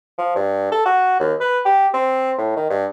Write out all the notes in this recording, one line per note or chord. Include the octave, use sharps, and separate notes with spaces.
F3
G2
A4
F#4
D#2
B4
G4
C4
A2
D#3
G2